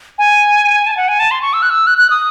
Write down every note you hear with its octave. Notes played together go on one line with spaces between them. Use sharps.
G#5
A5
G#5
F#5
G#5
A5
C6
C#6
E6
F#6
E6
F#6
F#6
D#6